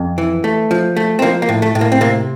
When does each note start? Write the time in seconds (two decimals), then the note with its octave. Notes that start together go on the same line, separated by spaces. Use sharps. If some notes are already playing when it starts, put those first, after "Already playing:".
Already playing: F2
0.18 E3
0.44 A3
0.71 F3
0.96 A3
1.19 C4
1.22 F3 A#3
1.42 A#3
1.49 A2
1.62 A3
1.75 A2
1.81 A#3
1.92 C4
2.01 C3 A#3